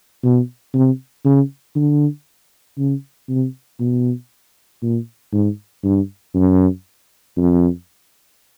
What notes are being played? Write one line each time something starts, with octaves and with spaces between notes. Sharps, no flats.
B2
C3
C#3
D3
C#3
C3
B2
A#2
G#2
G2
F#2
F2